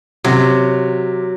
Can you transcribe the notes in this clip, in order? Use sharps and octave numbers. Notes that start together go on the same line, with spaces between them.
C3 F#3